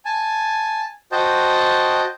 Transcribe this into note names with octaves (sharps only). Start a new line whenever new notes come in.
G#5 A5
F#4 C5 D#5 G5 A5